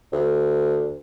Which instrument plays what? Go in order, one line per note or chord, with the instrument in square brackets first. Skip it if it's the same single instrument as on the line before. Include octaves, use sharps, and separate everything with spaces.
[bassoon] D2